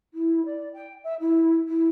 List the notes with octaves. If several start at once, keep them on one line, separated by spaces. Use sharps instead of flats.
E4
D5
G5
E5
E4
E4